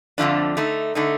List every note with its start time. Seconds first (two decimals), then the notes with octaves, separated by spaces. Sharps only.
0.18 F2 D3 F3 A3 D4
0.57 D3 A3 D#4
0.95 D3 A3 D#4